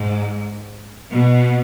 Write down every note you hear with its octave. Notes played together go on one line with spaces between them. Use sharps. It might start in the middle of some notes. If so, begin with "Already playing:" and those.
Already playing: G#2
B2